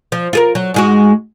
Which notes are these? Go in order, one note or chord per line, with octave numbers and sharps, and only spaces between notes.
F3
F4 G#4 A#4
F#3
G#2 G#3 F#4